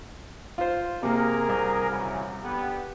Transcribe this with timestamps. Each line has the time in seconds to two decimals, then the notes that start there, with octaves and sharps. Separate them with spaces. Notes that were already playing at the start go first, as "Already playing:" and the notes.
0.58 F4 C5
1.03 C3 A#3 G#4 A#4
1.49 C2
1.90 C#3 E3 F#3
2.43 D3 B3 G4